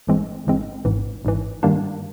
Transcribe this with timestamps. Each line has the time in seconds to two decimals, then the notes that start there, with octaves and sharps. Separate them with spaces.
0.07 G1 G2 E3 G#3 C4
0.47 G1 G2 E3 G#3 C4
0.85 G#1 G#2 E3
1.25 G#1 G#2 E3
1.63 G2 D#3 G3 A#3 D4